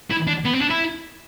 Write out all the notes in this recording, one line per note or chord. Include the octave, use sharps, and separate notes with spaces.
E4
D4
B3
C4
D4
E4